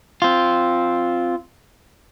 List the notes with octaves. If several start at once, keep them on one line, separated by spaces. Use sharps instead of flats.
C4 F4